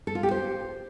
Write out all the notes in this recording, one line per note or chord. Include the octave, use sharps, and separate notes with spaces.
A4
F4
G4
C5